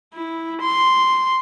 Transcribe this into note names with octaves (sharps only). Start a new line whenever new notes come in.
E4
C6